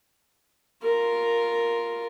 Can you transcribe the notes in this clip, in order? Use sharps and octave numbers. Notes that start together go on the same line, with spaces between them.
F4 A#4